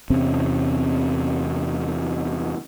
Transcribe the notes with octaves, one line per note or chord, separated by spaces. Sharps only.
E2 C3 C4 C#4